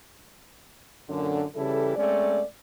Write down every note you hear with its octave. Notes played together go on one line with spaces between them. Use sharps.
F#2 A#2 D3
C#3 E3 G3 E4 G4 A4
G#3 A3 C4 C#4 D5